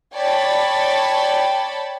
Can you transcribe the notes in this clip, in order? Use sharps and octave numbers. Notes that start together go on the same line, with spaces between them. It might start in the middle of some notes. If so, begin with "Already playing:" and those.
C#5 D5 G5 A5 B5